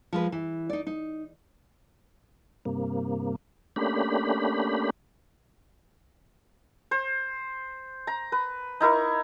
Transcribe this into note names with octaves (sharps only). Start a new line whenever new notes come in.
F3 G#3 B4
E3
D#4 D5
D#4
G2 C3 A#3
A3 A#3 C#4 D4 G4 B5
C5
A#5
B4
D#4 E4 A#4 C#6